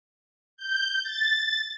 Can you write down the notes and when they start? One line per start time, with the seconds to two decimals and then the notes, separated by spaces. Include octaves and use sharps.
0.57 G6
1.03 A6